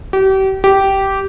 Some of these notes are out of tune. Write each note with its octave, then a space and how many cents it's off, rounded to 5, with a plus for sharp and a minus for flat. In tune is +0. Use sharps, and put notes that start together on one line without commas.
G4 -35
G4 -10